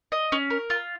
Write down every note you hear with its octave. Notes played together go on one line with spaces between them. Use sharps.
D#5
C#4
A#4
F4